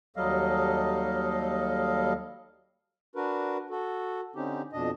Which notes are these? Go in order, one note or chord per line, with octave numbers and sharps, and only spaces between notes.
D#2 F#3 G3 A4 D#5 F5
D4 F#4 A#4 B4
F#4 A4
D3 C4 C#4 D#4 G4
F2 B2 D4 D#5